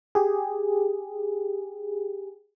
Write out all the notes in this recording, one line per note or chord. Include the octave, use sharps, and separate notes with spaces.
G4 G#4